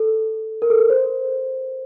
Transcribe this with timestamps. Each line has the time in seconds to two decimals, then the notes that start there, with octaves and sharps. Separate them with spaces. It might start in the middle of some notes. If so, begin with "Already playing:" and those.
Already playing: A4
0.62 A#4
0.70 A4
0.79 A#4
0.90 C5